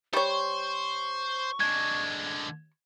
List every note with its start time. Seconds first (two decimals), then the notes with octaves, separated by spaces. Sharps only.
0.13 G3 C5 C#5 C#6
1.60 D3 G#3 G#6